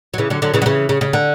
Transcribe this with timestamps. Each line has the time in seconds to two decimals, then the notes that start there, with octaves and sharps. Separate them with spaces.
0.14 F#3
0.18 C#3 E3
0.30 D3 F#3
0.42 D3 F#3
0.54 C#3 E3
0.62 F#3
0.66 C#3 E3
0.89 C#3
1.01 C#3
1.13 D3